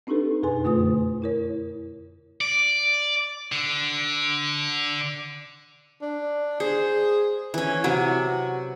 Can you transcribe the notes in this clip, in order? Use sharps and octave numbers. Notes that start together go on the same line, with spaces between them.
C4 D4 D#4 G4 A4 B4
F2 B2 G#4 B4 G#5 C6
F#2 D3 A3 F4 B4 D#6
E4 A#4 C#5
D5
D3
D4
G#4 C5
E3 C#4
C3 F#3 F#4